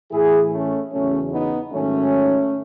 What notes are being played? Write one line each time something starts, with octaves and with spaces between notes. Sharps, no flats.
A2 E3 E4 G#4
A3 C#4
E2 C#3 F#3 A3 C#4
B3 D#4
G#2 D#3 F#3 A3 C#4